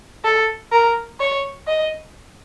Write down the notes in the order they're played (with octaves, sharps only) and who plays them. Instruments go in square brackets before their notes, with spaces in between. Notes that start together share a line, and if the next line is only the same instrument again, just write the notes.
[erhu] A4
A#4
C#5
D#5